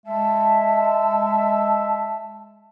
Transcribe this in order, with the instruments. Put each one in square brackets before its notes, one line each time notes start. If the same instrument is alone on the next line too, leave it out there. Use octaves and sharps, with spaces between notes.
[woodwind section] G#3 E5 [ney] A5